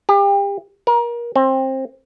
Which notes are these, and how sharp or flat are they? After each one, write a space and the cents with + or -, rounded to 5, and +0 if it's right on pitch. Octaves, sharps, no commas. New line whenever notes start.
G4 +35
A#4 +30
C4 +20